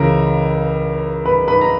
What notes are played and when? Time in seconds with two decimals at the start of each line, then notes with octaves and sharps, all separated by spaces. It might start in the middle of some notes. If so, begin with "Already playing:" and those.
Already playing: C#2 C#3 E3 A#4
1.25 B4 B5
1.48 B4 B5
1.61 A#5